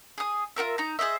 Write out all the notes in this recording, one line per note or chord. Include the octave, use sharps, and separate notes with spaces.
G#4 D#6
F4 F#4 A#4 E5
D#4 A#5
G#4 C5 D#5 E5